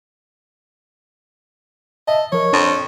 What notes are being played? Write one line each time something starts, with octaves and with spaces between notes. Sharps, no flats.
D#5 E5 A5
F3 A#4 C#5
F2 D4 C6